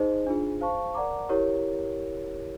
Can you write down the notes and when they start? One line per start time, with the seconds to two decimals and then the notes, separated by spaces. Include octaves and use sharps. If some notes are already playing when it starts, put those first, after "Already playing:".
Already playing: D#4 G#4 C5 D#5
0.27 D4 F4 G#4
0.61 C5 F5 A5 C#6
0.94 A#4 D5 F#5 A#5 D6
1.29 E4 G4 A#4 C#5